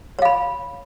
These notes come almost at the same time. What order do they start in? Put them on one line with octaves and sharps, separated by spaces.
C#5 F5 B5